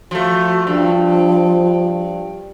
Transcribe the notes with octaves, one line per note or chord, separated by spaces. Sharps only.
F3 A3 F#4
G2 F3